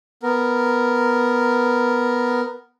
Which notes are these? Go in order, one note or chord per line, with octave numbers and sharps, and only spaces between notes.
B3 A#4